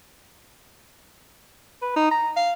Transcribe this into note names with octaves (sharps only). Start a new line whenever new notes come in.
B4
D#4
A#5
F5